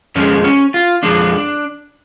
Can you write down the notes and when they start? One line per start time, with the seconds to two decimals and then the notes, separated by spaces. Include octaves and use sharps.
0.15 F2 F3 G#3 C#4
0.44 C#4
0.74 F4
1.03 F2 F3 G#3 D4